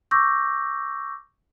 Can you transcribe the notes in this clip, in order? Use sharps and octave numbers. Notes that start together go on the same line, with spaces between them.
C#6 D6 E6 G6 A#6